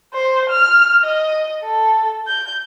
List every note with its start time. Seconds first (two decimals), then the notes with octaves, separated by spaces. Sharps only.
0.14 C5
0.50 F6
1.04 D#5
1.63 A4
2.28 G6